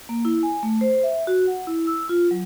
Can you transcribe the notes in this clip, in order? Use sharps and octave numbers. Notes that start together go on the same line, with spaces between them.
A#3
E4
G#5
A3
C5
E5
F#4
F#5
E4
E6
F4
F#3